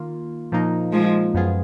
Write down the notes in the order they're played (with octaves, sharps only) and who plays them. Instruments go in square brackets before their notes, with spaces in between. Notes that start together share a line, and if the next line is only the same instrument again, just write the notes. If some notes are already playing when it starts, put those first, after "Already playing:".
Already playing: [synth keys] D#3 A#3 F4
A#2 F3 A#3 D#4
[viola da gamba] F3 G#3
[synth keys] F#2 F3 B3 F4 G#4